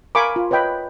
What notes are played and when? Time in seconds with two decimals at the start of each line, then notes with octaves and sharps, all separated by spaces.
0.15 A#4 F5 G#5 B5 C#6 D6
0.36 F4
0.51 B4 C#5 D#5 G5 B5